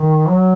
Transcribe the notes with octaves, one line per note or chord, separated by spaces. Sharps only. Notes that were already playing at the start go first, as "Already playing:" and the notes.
Already playing: D#3
F#3